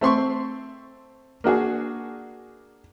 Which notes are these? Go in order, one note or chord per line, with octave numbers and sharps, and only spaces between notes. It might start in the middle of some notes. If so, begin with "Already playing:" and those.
A3 C4 C6 C#6
A#3 D4 F#4 G#4